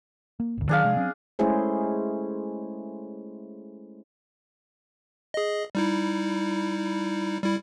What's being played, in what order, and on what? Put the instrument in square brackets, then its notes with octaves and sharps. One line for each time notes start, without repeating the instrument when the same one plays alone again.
[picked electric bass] A#3
G#1 D2
[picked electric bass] D#3 F3 F#3 [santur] D4 G#4 F5
[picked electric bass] C3 F3 G#3
F#3 C4 C#4
[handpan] G#3 A3 C#4 E4 G#4 C5
[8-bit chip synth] G#4 D#5
G3 D#4 E4
G3 E4